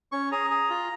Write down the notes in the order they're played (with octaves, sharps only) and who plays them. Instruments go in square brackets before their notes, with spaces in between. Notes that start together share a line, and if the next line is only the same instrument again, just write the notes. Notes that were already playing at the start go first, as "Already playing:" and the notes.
[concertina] C#4 C#6
G#4 A#5
G#4
F4